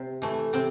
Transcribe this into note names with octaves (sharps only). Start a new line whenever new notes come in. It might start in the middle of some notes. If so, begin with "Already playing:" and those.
Already playing: C3
E3 A3
C3 C4